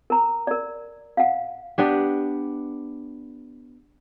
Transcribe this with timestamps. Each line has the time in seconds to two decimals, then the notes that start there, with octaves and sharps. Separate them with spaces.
0.10 A#4 A#5
0.47 A#4 D5
1.17 F5 F#5
1.78 B3 D4 G4